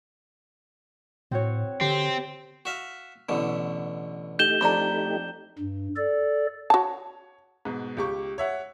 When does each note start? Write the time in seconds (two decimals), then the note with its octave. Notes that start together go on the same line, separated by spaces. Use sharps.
1.31 A2 C4 F#4 C#5
1.81 D3 C4 G4
2.65 F#4 E5 F5
3.29 A1 B2 D3
4.39 A3 D#4 G4 G6 E7 G7
4.61 F2 D4 A#5 B5
5.59 G2
5.97 A4 D5
6.70 F#4 C#5 A5
7.65 G#2 B2
7.97 C#2 G4 C#6
8.38 C#5 E5 F#5